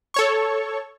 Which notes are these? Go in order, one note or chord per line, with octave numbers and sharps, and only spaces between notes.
A4 C#5 C#6